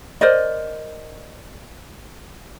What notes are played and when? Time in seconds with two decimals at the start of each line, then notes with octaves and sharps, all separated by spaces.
0.21 A#4 C5 D5 D#5